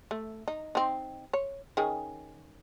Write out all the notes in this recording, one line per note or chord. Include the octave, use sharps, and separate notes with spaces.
A3
D#4
C4 D#4
C#5
D#3 C#4 G#4